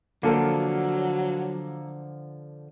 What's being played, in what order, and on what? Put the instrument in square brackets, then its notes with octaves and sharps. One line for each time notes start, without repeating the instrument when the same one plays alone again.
[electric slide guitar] D3 F3 [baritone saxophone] F#3 [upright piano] A#3 A4